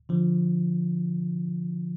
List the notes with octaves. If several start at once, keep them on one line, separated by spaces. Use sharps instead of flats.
D3 F3